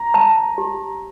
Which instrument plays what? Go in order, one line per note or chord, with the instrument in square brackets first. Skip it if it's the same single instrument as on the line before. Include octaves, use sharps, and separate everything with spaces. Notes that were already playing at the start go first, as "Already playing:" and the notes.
Already playing: [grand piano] A#5
[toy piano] A5
G4